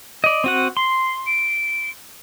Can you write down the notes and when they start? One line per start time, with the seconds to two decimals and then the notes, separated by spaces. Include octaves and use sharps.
0.24 D5 D#5
0.44 C4 F#4 F#5 D#7
0.77 C6 C7
1.27 D7